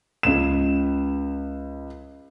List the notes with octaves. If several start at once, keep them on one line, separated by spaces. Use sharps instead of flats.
C#2 E7